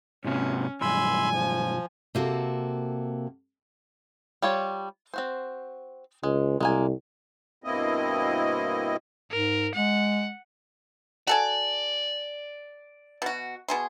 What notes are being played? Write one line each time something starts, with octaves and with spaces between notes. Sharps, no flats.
G#2 C3 C#4
B1 G2 G#5 B5 C6 E6
F3
C3 A#3 F#4 A4
G3 F4 C#5
C4 F#4 C5
C#2 G#3
C2 G#3 A#3 G#5
G2 B2 A#3 C4 E4 D#5
G#2 A#4
G#3 F#5
F#4 A4 D5 G#5
B2 F#4
B2 G#4 C6